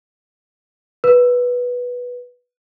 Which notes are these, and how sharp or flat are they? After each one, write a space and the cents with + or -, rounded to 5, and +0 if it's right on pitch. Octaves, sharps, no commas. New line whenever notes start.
B4 -10